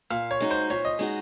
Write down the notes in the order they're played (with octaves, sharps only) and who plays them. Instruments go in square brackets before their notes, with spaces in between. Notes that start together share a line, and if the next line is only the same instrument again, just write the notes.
[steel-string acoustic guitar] A#2 [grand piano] F5
[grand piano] C#5
[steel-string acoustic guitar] G#3 D#4 F#4
[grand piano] C5
[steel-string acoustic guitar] A#2 [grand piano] C#5
[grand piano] D#5
[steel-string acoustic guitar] G#3 D#4 F#4